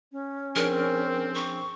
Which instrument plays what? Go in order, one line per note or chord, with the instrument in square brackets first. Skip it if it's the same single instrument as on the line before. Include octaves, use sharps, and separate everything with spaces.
[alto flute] C#4
[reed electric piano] F3 D4 G#4 [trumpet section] C4 [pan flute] A#4
[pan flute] C#6